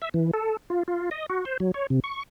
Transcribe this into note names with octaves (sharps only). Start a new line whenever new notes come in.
E5
E3
A4
F4
F4
D#5
F#4
C5
F#3
C#5
C3
C#6